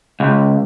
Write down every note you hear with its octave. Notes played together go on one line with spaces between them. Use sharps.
C#2